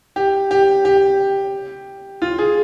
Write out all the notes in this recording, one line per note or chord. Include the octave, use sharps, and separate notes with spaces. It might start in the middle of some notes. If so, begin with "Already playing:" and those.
G4
G4
G4
F4
G#4